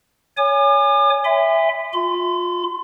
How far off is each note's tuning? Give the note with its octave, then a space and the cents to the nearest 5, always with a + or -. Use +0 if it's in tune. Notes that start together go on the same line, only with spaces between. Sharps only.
C#5 +20 G#5 -10 D6 +45
E5 +0 G#5 -35 C6 -45
F4 +25 C6 -45